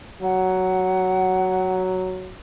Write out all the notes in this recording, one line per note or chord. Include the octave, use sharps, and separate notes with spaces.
F#3 F#5